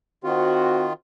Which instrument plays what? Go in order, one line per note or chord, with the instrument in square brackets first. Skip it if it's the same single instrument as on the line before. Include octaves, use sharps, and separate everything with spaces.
[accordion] D#3 F4 [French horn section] C4 F#4